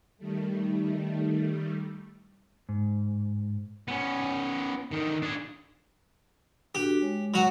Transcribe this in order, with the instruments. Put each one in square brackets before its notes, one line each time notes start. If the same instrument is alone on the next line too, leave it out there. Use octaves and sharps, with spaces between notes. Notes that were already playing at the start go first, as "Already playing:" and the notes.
[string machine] D#3 G3 A3
[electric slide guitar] G#2
[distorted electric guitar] B3 C#4
D3 D#3
D4 G#4
[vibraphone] D4 F#4 A4 [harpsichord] G4
[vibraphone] G#3 C#5
[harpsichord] F#3 F#4